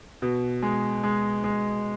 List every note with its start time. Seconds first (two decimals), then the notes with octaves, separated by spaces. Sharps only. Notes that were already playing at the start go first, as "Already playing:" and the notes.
0.22 B2
0.62 G#3
1.03 G#3
1.44 G#3